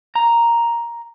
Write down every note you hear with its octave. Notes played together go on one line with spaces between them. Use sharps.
A#5